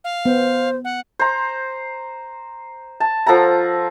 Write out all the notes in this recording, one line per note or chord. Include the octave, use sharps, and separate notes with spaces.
F5
B3 C5
F#5
C5 A#5
A5
F3 A4 F#5 A#5